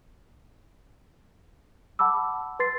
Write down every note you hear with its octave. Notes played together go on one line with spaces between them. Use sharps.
F#5 A5 B5 D6 E6
B4 C6 A6 C7